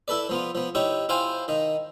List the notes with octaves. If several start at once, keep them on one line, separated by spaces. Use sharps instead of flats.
E4 A4 B4 D5
F3 B3 F4
F3 B3
D#4 E4 G4 C#5
E4 F4 C5 F5 G5 G#5
D#3 D#4